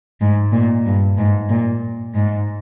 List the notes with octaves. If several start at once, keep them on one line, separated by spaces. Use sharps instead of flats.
G#2
A#2
G2
G#2
A#2
G#2